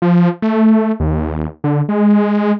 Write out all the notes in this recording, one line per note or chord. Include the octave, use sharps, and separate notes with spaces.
F3
A3
D#2
D3
G#3